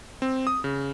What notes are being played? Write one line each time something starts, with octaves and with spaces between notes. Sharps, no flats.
C4
D#6
C#3